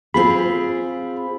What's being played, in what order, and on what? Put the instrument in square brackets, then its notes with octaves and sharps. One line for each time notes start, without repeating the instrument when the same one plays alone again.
[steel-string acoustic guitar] C4 F4 G#4 [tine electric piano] B5